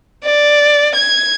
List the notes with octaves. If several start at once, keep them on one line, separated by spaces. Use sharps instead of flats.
D5
G#6